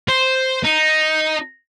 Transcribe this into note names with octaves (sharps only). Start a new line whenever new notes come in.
C5
D#4